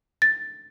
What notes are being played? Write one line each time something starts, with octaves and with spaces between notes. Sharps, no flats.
A6